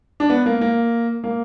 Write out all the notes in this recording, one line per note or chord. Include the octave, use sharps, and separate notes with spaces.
D4
B3
A#3
A#3
A#3